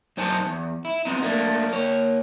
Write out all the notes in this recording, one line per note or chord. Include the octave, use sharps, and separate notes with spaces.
F#2 D#4 C5 G#5 A5
E2
E4
F3 B3 C4 D#4
A3 A#3 D4
A#3 C#5